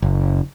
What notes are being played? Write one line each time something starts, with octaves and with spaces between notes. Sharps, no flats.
F#1